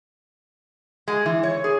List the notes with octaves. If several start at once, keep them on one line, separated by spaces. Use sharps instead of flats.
G#3
E3
C#5
G#4